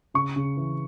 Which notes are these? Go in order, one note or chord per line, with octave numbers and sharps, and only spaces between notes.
C#3 C#6
C#3
E3